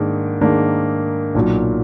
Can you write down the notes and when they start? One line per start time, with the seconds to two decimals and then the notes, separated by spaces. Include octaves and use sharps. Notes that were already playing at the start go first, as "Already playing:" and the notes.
Already playing: G#2 D#3 A#3 D4
0.41 G#2 D#3 A#3 D4
1.34 B1 A#2 F#3